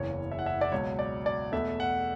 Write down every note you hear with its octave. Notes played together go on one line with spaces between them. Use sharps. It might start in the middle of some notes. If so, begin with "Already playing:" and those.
Already playing: F#1 E2 C#3 E3 C#5
E5
F#5
E5
D5
C#2 B2 F#3 C#5
D5
D5
E2 B2 A3 E5
F#5